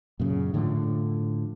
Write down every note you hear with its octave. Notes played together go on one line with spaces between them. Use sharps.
F#2 A#2 C#3
A2 D3 F3